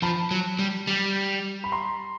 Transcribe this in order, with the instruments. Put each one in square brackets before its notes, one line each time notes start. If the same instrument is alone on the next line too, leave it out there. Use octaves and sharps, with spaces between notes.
[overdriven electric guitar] F3 [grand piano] A5 B5
[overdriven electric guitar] F#3
G3
G3
[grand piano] B5
A#5 C6